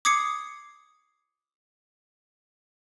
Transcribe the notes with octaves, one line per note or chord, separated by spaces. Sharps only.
D6 D#6 G#6 C7 C#7